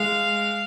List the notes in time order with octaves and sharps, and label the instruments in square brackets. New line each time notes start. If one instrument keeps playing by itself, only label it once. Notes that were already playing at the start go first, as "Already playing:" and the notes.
Already playing: [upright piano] G#3 [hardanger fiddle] F5